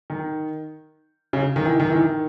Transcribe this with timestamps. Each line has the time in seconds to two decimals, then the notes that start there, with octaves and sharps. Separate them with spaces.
0.10 D#3
1.33 C#3
1.56 D#3
1.65 E3
1.80 D#3
1.90 E3
1.95 D#3